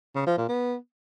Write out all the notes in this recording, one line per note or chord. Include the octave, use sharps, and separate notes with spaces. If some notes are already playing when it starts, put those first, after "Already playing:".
C#3
F3
A#2
B3